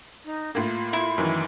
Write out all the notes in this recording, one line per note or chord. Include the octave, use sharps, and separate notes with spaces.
D#4
A2 A#3 F4
E4
F#2 D#3 E3